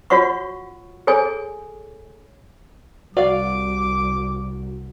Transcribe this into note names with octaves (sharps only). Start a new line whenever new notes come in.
F4 F#4 C#5 F#5 C#6
G#4 A4 C#5 G#5
C2 F#4 D5 F5 D6